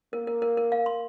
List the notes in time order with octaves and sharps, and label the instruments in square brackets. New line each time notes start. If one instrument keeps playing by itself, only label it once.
[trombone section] A#3 [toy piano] A#4
[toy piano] A#4
A#4
A#4
F5
C6